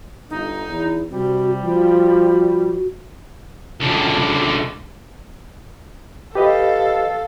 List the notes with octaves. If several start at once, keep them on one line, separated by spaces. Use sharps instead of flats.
G1 D#4
E2 E4
C3 G3 F#4
F3 F#4
C#2 D3
G4 A4 B4 D#5 F5